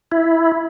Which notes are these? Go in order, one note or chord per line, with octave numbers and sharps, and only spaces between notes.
E4